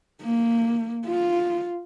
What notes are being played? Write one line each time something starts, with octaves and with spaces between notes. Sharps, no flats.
A#3
F4